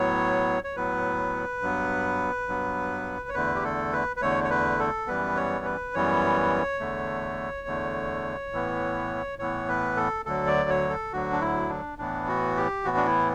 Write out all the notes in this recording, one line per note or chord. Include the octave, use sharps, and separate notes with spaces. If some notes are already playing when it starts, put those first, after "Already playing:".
Already playing: A2 F#3 B3 C#5
C#5
A2 F#3 B3 B4
G2 F#3 B3
G2 F#3 B3
C#5
E2 D3 A3 B4
G4
A4
B4
B4
E2 D3 A3 C#5
C#5
B4
A4
F#2 E3 G3 B3 B4
C#5
B4
F#2 E3 G3 B3 C#5
E2 D3 A3
E2 D3 A3
A2 E3 B3
A2 E3 B3 C#5
B4
A4
D2 D3 F#3 A4
D5
C#5
A4
D2 D3 F#3 F#4
D4
E4
D4
A2 E3 B3 D4
F#4
G4
A2 E3 B3 F#4
D4
E4